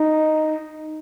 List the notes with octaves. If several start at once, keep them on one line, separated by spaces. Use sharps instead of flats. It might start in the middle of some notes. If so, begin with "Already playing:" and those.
Already playing: D#4